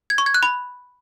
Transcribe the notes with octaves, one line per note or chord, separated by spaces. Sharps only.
G#6
C#6
G#6
F#6
B5